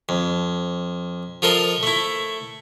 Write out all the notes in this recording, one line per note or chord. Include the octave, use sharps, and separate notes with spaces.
F2
F3 F4 A4 A#4 D#5
A3 E4